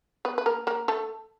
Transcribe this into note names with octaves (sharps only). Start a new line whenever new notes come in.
B3 B4
B4
A#3 A#4
A#3 A#4
A3 A4